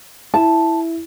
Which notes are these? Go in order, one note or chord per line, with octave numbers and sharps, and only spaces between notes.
E4 A5